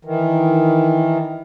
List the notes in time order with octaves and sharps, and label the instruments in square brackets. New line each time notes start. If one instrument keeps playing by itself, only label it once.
[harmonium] D#3 E3